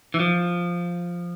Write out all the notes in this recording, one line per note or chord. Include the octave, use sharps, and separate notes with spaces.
E3
F3